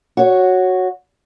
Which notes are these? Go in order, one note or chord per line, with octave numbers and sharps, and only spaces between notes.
F#4 C#5